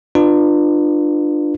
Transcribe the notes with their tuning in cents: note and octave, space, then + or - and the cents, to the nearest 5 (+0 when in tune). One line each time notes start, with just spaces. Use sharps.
D4 +30 F4 +0 B4 +0